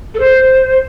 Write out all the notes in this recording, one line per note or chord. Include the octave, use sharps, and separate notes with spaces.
A4
C5